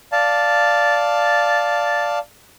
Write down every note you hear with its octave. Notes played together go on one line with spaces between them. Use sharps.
D5 F5 A5